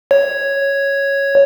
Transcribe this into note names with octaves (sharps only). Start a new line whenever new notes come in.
C#5